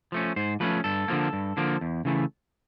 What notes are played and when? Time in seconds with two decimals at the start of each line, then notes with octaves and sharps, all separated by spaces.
0.12 F3 A3 C#4
0.36 G#2 C5
0.60 F3 A3 C#4 B4
0.84 G2 A4
1.08 D3 F3 A#3
1.33 G2
1.57 D3 F3 A#3
1.81 E2
2.05 C#3 E3 A3